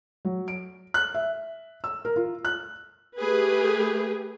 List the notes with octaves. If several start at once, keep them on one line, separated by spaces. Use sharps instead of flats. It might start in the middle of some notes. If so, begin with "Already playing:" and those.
F#3
D7
F#6
E5
E6
A#4
F4
F#6
A3 G4 G#4 B4